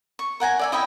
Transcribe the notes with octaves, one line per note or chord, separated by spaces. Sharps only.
C#6
A#4 F#5 G#5 A#5
D5 E5 G#5
E4 D#5 G5 B5